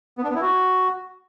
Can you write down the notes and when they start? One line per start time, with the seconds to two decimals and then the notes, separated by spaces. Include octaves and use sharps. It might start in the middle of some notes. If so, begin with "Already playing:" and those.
0.18 B3
0.24 D4
0.30 B3
0.35 E4
0.41 F#4